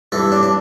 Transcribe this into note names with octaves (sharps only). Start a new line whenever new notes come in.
G2 E3 A4
D4
D4